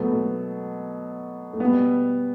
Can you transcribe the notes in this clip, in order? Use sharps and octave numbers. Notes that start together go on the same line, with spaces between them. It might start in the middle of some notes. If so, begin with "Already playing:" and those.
Already playing: B2 F#3 A3 B3
A3
A3
B2 G3 B3